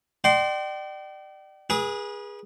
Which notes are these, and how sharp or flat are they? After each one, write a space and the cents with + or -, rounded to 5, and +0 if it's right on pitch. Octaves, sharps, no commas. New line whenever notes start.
D5 +35 G5 -35 C6 +0
G#4 -15 B4 -35 D#6 +30